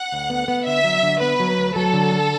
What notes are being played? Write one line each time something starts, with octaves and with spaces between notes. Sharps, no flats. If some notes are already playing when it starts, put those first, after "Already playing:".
Already playing: F#5
D2
B3
B3
D3 E5
F#3
D3
B3 B4
F#3
D2
F#3 A4
D3
D4